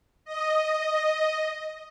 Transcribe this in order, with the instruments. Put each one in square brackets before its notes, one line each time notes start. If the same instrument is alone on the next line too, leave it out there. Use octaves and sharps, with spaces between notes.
[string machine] D#5